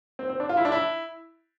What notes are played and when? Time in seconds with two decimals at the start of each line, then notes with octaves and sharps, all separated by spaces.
0.19 C4
0.29 C4
0.40 D4
0.49 F4
0.57 E4
0.65 D4
0.72 E4